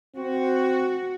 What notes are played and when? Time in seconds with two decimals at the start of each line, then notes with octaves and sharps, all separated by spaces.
0.16 C4 F#4